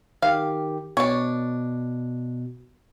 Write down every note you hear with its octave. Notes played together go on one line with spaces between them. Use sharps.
D#3 G4 F5
B2 D4 C#5